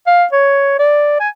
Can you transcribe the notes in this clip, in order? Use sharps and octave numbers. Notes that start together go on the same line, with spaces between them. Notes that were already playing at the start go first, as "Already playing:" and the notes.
F5
C#5
D5
G#5